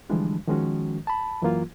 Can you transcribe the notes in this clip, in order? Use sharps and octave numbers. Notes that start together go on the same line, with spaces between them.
D3 E3 F3 G3 G#3 D4
D#3 F3 G#3 C#4 F#4
A5 B5
F#2 E3 F#3 A#3 F4